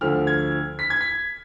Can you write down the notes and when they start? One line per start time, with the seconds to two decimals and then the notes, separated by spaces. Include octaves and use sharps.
0.01 D2 D3 F3 F6
0.27 G#6
0.79 B6
0.90 G#6
1.01 B6